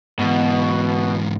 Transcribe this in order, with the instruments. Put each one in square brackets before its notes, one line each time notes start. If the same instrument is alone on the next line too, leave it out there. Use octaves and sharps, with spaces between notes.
[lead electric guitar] G#2 E3 [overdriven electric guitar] B2